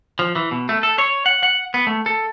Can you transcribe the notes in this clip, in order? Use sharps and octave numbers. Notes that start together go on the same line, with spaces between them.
F3
E3
B2
A3
A4
C#5
F#5
F#5
B3
A3
A4